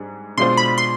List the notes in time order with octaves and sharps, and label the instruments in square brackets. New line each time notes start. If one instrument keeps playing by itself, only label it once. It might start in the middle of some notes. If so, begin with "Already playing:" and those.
Already playing: [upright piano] G#2 G3 D4 G#4
[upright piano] B2 G#3 D4 F4 C5 [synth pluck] C6
[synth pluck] B5
C6